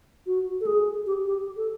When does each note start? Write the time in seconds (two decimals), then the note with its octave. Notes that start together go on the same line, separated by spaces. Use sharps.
0.26 F#4
0.61 A4
0.67 G#4
1.06 G4
1.27 G4
1.57 A4